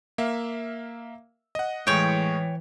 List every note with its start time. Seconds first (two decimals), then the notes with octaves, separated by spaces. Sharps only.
0.18 A#3 E5 F5
1.55 D#5 F#5
1.87 A2 E3 G#3 C#5 G5 C#6